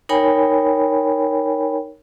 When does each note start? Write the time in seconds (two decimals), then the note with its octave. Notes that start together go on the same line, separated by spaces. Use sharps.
0.09 D#4 A#4 C#5 G5 G#5 B5